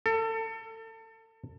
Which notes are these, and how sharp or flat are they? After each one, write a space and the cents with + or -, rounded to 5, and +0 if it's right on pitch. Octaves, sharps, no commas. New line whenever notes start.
A4 +30